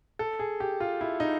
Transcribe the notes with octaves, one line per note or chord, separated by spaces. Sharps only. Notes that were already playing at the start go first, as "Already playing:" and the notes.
A4
G#4
G4
F4
E4
D#4